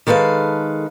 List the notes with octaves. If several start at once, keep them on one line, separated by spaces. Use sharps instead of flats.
D#3 G#3 A4 B4 F5